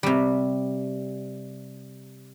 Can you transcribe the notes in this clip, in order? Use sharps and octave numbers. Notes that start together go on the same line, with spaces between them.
C3 G3